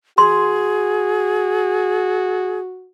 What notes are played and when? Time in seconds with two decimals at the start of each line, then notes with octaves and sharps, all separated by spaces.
0.18 F#4 G#4 C6